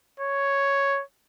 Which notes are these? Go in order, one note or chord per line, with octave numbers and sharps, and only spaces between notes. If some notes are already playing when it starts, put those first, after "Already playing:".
C#5